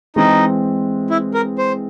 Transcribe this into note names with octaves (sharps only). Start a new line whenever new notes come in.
E3 G#3 C4 D#4
E4
A#4
C5